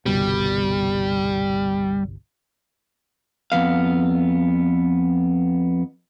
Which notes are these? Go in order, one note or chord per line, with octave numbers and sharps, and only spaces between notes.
G1 C2 B2 G3
F2 B3 F5